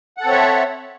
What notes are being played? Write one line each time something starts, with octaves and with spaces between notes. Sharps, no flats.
C4 A4 C#5 E5 F#5